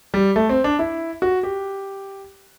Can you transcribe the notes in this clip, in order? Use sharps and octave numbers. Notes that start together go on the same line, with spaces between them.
G3
A3
C4
D4
E4
F#4
G4